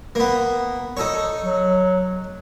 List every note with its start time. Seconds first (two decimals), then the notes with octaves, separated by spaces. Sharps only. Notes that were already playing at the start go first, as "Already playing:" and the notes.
0.15 A#3 B3
0.97 D#4 A4 C#5
1.41 F#3